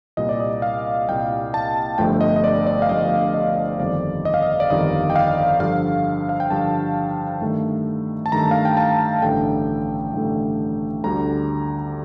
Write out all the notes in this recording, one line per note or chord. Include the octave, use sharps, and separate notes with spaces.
C2 A#2 G3 D#5
D5
D#5
F5
C2 A#2 G3 G5
A5
G1 G2 F3 A3 G5
D#5
D#5
D5
D5
F5
G1 G2 F3 A3 D#5
D#5
G1 F2 D#3 G3 D5
D#5
F5
D#5
D5
G1 F2 D#3 G3 D#5
G5
F5
G2 D3 F3 F5
F5
G5
G2 D3 F3 A5
G2 D#3 A3
A5
G2 D#3 A3 A#5
F5
G5
A5
A1 G2 D3 A3 G5
A1 G2 D3 A3
D2 D3 G3 A#5